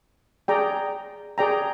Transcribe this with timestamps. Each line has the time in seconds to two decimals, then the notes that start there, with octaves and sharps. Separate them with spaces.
0.48 G#4 D5 G5 A#5
1.38 G#4 D5 G5 A#5